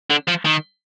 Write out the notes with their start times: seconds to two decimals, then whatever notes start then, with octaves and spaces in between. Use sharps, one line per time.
0.10 D3
0.28 F3
0.45 D#3